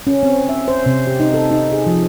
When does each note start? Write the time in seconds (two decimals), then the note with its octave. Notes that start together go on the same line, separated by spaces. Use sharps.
0.07 C#4
0.23 C4
0.49 E5
0.68 C5
0.86 C3
1.07 G4
1.20 D#4
1.34 A4
1.51 D#4
1.72 G#4
1.87 F3